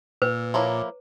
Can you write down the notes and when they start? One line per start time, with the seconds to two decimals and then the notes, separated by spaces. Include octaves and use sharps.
0.22 A#2 B4 E6
0.54 F3 A#3 E4 C#5 A#5 D6